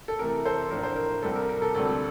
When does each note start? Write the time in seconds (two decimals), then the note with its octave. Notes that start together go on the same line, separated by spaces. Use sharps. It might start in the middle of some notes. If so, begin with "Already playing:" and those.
0.08 A4
0.19 C3 E3 A3 A#4
0.45 A4 C5
0.71 A2 F3 A3 D4 A#4
0.83 C5
0.96 A#4
1.23 C2 C3 G3 C4 A4
1.36 A#4
1.49 A#4
1.62 A4
1.75 D2 C3 G3 C4 A4